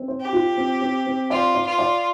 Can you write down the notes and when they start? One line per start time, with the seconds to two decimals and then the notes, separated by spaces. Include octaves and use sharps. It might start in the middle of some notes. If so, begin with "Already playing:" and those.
Already playing: C4
0.08 C5
0.20 G4
0.33 F4
0.57 C4
0.81 C4
1.06 C4
1.30 F4 D5
1.54 D5
1.66 F4
1.79 D5